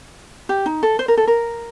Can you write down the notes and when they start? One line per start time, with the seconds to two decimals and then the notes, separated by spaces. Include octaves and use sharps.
0.49 G4
0.66 D#4
0.83 A4
0.99 C5
1.08 A#4
1.17 A4
1.27 A#4